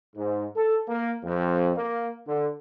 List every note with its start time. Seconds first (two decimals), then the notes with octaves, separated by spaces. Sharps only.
0.16 G#2
0.56 A4
0.88 A#3
1.24 F2
1.76 A#3
2.27 D3